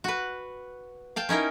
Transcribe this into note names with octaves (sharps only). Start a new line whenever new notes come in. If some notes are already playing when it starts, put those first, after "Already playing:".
F#4 B4
F5 G5 A5
C#4 D#4 E4 A#4